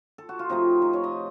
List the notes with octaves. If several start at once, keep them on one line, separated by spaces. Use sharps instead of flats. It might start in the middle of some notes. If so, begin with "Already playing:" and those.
A4
F#4
F4
C3 F3 A3 D#4
D#4
C#5
D#5